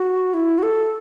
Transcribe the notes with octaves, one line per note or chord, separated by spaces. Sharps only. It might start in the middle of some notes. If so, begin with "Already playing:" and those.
Already playing: F#4
E4
F#4
A4